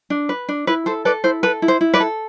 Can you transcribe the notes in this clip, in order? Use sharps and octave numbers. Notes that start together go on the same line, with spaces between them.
D4
B4
D4
E4 B4
A4 C5
A4 B4 D5
E4 C5
A4 B4
E4
C5
E4
B4 D5
A4